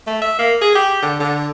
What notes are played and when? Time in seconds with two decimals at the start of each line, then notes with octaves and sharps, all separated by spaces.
0.07 A3
0.22 E5
0.39 A#3
0.61 G#4
0.75 G4
1.03 D3
1.20 D3